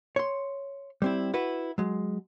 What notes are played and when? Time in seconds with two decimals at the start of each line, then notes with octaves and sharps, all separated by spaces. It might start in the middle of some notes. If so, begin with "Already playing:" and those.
0.16 C#5 C6
1.02 G3 C4 E4
1.34 E4 F#4 B4
1.78 F#3 G#3